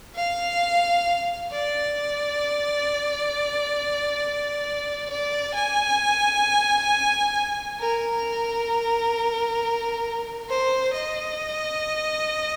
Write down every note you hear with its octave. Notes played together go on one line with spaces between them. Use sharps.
F5
D5
D5
G#5
A#4
C5
D#5